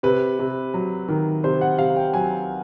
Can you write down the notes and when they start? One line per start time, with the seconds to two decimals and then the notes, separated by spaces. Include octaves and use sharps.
0.03 C3 B4
0.39 C3
0.74 F#3
1.08 D#3
1.44 C3 C5
1.61 F#5
1.78 C3 F5
1.96 G5
2.13 F#3 G#5